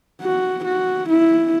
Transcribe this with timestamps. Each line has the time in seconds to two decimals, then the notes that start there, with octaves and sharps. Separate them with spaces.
0.21 F#4
0.65 F#4
1.09 E4